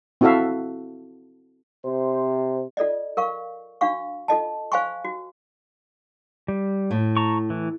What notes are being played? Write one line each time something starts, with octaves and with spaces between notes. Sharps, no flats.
C4 E4 F#4 A4 E5 F5
C3 C5
F4 A4 D5 D#5
A#4 F5 C#6
D4 F#4 F5 C#6
F4 A4 D#5 A5
C5 F5 G#5 C6 C#6
F#4
G3
A2
A5 A#5 C#6
E3